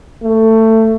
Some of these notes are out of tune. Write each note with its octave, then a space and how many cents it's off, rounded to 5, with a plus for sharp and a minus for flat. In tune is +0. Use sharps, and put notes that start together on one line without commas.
A3 +20